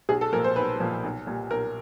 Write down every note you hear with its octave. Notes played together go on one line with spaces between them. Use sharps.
B1 G#4
A4
A#2 F3 A#3 A#4
C5
B1 B4
A#2 F3 A#3
B1
A#2 G3
B1 A#4